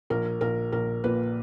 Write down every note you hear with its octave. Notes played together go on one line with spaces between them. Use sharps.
A#1 A#4
A#1 A#4
A#1 A#4
A#2 B4